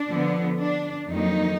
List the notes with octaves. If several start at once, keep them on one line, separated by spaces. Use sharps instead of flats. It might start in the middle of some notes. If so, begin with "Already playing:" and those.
Already playing: D4
D3 F3 B3
D4
F2 D#3 F#3 A#3 D#4